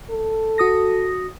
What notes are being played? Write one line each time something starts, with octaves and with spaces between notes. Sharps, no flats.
A4
F#4 D#6 A#6